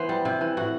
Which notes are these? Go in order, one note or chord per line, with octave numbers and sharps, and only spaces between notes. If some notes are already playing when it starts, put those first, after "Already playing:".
Already playing: E3 B3 C5
G3
C3
E3
A2 F#4